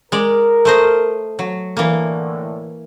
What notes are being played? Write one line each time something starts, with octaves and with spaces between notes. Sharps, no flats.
G#3 A#4 D5
A3 C5 D#5
F#3
A2 D3 E3 A3 A#3